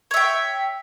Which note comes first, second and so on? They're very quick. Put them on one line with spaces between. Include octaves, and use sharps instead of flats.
C#5 E5 G5